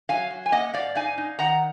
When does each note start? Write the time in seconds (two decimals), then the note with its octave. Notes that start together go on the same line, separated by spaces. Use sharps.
0.09 F#3 F5 G#5
0.30 F#3
0.46 G#5
0.52 A#3 D#5 F#5
0.74 G#2 D5 F5
0.95 D#4 F5 G#5
1.18 D#4
1.39 D#3 F#5 A#5